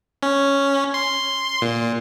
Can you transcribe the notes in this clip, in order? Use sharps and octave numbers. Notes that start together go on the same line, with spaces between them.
C#4
C6
A#2